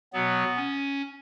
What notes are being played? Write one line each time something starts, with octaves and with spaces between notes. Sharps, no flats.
B2 F#3 B3
C#4